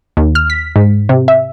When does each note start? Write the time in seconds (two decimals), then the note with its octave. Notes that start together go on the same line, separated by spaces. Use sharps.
0.17 D#2
0.35 F6
0.50 B6
0.76 G#2
1.09 C3
1.28 E5